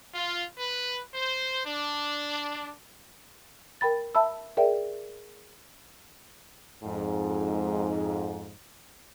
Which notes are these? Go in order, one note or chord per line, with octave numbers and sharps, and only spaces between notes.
F4
B4
C5
D4
A#4 G5 B5 A6
E5 A5 B5 E6
G#4 A#4 D5 E5 G5
F2 G#2